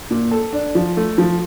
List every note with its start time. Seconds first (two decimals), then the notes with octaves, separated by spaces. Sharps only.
0.11 A#2
0.31 A4
0.53 D4
0.75 F3
0.97 A3
1.18 F3